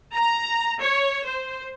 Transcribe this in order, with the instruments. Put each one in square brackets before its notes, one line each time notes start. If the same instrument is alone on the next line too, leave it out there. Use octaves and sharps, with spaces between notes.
[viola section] A#5
C#5
C5